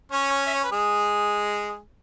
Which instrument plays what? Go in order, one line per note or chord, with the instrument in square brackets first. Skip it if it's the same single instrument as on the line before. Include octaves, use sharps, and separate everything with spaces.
[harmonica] C#4 C#5
E5
C#5
B4
G#3 G#4